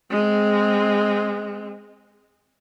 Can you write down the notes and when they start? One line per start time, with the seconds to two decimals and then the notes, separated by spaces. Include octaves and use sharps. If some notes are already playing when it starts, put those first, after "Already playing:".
0.10 G#3 C4